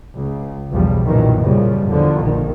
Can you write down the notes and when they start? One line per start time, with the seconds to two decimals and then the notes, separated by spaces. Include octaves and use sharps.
0.15 C#2
0.71 B1 E2 F3 G3
1.06 B1 F#2 A#2 D#3 E3
1.41 F#2 A#2 C#3 F3 G3
1.87 E2 D3 F3
2.20 A#1 D#3